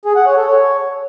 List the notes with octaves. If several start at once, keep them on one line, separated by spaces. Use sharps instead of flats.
G#4
F#5
C#5
A4
C#5